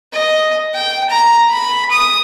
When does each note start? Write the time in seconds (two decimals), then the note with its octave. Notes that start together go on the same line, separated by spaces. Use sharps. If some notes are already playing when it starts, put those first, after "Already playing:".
0.13 D#5
0.75 G5
1.10 A#5
1.50 B5
1.91 D#6